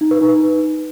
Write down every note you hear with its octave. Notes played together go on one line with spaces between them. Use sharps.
D#4
B4
D#4